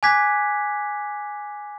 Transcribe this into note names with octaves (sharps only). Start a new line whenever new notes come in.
G#5 D6 F#6 G#6 B6